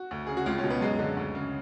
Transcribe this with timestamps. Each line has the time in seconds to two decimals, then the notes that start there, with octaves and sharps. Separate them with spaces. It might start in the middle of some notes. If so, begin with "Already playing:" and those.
Already playing: F#4
0.11 D2
0.27 C#3 G#4
0.37 F#4
0.46 C#2 F4
0.58 C#4
0.64 B2
0.70 B3
0.81 F#2 G#3
0.99 D3
1.17 D2
1.35 C#3